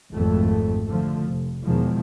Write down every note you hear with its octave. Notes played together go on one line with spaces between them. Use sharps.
G#1 F2 A3
D3 F3 A3
F1
E2 B2 D#3 F3 G#3